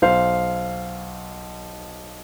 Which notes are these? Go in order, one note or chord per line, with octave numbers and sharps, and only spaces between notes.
B1 C5 F5